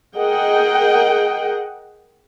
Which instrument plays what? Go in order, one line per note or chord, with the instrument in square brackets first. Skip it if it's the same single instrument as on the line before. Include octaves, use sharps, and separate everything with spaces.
[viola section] G#4 A#4 D#5 F#5 G5